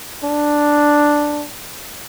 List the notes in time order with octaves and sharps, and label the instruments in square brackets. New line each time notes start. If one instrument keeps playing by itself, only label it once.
[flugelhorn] D4